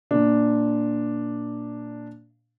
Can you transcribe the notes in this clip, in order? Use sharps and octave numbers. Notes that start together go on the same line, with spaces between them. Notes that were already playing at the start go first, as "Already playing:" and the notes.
A#2 D4